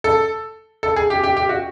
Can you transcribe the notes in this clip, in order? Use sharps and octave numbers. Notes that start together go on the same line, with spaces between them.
A4
A4
G#4
G4
G4
G4
F#4